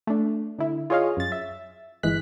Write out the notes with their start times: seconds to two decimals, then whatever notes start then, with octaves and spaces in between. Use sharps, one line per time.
0.07 A3 D4
0.59 D3 E4
0.90 F4 G#4 C#5 D#5 F5
1.17 F#2 A6
1.32 E5
2.03 G1 E3 G#3 F#6 B6